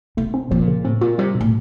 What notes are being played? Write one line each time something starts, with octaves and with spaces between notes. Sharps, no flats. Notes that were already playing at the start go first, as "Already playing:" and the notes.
B2 A3
C4
A#2 F3
C#3
A2 C4
A#2 F4
C3 G3
B2
A2